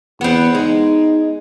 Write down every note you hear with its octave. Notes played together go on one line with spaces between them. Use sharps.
E2 B3 C4
G#3 D#4